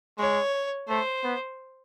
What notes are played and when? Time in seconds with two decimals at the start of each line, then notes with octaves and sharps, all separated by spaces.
0.18 G#3 C#5
0.88 A3 C5
1.24 B3